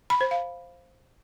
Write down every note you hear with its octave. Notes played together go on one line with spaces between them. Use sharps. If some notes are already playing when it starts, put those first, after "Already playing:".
B5
C5
F5